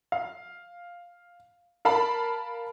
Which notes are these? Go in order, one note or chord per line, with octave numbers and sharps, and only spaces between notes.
F5
A#4 F5 A5 B5